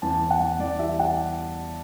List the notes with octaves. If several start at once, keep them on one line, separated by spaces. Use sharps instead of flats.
E2 A5
E2
F#5
E2
E2 D5
E3 E5
E3 F#5